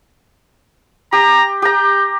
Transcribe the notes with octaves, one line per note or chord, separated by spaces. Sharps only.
G4 A#5
G4 A#5 G6